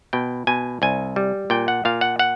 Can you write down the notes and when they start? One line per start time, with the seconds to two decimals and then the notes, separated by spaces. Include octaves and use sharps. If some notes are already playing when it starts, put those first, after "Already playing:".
0.13 B2 G5
0.47 B2 G#5
0.82 C2 G#5
1.16 G3
1.50 A#2 G5
1.68 F#5
1.85 A#2 F5
2.01 F#5
2.19 F#5